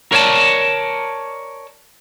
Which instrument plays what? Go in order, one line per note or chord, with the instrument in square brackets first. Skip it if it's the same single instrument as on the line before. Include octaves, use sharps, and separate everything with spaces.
[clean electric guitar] A#4 C#5 D5 G#5 A5